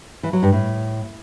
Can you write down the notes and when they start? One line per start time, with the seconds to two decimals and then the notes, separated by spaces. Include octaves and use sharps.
0.23 E3
0.33 F#3
0.43 G2
0.52 A2